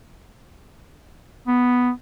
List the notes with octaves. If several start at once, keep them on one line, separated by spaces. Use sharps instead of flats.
B3